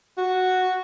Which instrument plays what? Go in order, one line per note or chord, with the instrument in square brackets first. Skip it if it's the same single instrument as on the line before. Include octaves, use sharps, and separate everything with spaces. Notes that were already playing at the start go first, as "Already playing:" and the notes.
[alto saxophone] F#4